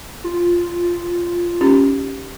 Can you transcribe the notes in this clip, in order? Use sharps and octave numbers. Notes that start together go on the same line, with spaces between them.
F4
C#4 D#4 G4